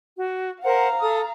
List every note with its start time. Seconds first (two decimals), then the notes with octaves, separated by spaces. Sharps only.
0.17 F#4
0.63 A#4 C5 F5 F#5 A#5
1.00 A4 D#6